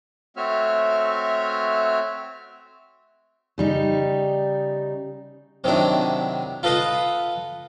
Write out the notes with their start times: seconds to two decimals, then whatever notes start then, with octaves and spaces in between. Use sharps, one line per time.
0.37 A3 C4 F#4 C#5 E5 F6
3.58 C#3 G3 D#4
5.64 C3 D#3 F#3 D4 E4
6.63 F4 A4 B4 D#5 F5 F#5